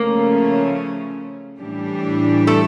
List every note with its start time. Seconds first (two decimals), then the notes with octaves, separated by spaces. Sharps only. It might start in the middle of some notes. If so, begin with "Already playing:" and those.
Already playing: C#3 F3 A3 A#3 C#4 A#4
1.59 A2 E3 G3 D4 G4
2.47 A3 A4